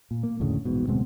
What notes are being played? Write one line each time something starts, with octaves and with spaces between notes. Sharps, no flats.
A#2
A#3
F1 D2 A2 C#3
E1 A#1 G#2 B2
D1 B2 G#3 C4